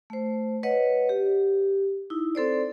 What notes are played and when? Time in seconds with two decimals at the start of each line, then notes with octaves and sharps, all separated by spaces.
0.10 A3 C5
0.63 B4 C#5 D#5 F#5
1.09 G4
2.10 D#4 E4
2.35 C4 A4 C5 D5